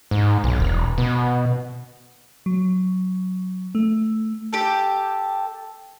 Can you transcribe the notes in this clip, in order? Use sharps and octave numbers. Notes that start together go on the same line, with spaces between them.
G#2
B1
E1
B2
F#3
A3
G4 A4